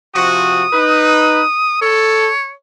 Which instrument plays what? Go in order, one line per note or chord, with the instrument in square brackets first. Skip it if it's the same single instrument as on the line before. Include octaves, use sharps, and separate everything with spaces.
[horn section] C3 F3 F#4 [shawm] D#6
[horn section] D#4 B4
[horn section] A4 [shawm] C#5